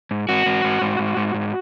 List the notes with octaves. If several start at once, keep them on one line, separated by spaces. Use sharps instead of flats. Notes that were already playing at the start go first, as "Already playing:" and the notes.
G#2
G#2 F#4
G#2
G#2
G#2
G#2
G#2
G#2